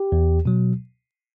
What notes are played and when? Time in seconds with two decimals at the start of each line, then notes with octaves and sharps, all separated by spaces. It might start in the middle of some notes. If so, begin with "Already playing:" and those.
Already playing: G4
0.12 E2
0.45 B2 F#3